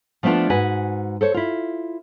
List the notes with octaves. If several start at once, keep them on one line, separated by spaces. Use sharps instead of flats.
F3 A3 B3 C4 D4 F4
G#2 F#4 B4 G#5
A4 C5 C#5
E4 F4